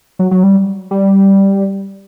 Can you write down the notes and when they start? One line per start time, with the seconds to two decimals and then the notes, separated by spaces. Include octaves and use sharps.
0.19 F#3
0.31 F#3
0.43 G3
0.91 G3